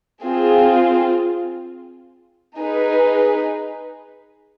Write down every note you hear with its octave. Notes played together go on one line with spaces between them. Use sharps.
C4 F4 G#4
D#4 G#4 B4